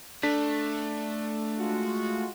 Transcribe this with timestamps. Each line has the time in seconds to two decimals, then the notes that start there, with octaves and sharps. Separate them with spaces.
0.23 A3 D4 B6
1.59 G#3 F4 F#4